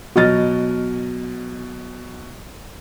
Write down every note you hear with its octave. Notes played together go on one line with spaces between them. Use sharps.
B2 F#3 D#5 F6 A6